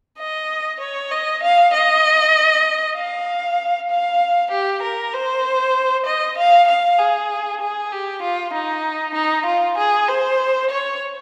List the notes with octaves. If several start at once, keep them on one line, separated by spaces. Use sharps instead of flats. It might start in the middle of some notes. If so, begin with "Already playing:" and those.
D#5
C#5
D#5
F5
D#5
F5
F5
G4
A#4
C5
D#5
F5
F5
G#4
G#4
G4
F4
D#4
D#4
F4
G#4
C5
C#5